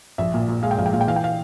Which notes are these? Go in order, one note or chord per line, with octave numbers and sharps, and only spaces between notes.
A#1 E5
A#2
A#2
G#3 F5
G5
A#1 F5
G5
A#2 F5
G5
E3 F5
G5
F5